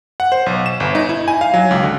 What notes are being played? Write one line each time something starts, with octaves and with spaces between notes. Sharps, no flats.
F#5
C5
B1
E7
G1
D#4
E4
G#5
F5
F#3
C#2
D3